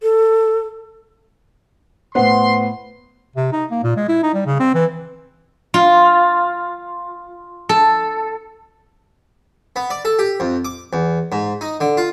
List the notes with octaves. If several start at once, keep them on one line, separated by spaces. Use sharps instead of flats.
A4
A2 B3 C5 F#5 C6
C3
D#4
A#3
A#2
G#3
E4
D#4
G3
C#3
C4
E3
F4
A4
B3
D5
A4
G4
F2
D6
E2
G#2
D#4
D3
F4